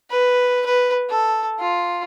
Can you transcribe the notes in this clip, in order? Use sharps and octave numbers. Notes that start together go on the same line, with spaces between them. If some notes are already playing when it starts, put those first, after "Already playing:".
B4
B4
A4
F4